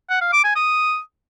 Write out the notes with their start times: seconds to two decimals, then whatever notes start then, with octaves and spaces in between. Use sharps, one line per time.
0.10 F#5
0.21 F5
0.33 D6
0.44 G#5
0.56 D#6